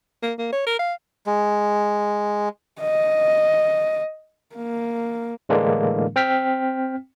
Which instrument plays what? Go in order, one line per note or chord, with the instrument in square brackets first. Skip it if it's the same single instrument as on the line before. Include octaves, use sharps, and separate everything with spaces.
[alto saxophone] A#3
A#3
C#5
A#4
F5
[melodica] G#3
[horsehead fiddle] D#5
A#3
[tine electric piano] A2 D3 E3 G#3 A#3 D4
C4 G5 F6 B6